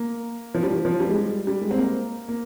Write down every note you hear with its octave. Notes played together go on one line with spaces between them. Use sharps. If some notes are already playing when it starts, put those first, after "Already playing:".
Already playing: A#3
F3
G3
F3
F3
G3
G#3
G3
G3
G#3
C4
A#3
A#3